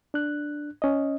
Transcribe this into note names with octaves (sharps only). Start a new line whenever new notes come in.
D4 F#6
C#4 D#5